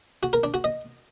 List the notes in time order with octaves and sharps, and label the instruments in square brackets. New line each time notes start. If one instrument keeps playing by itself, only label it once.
[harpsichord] F#4
A#4
D4
F#4
D#5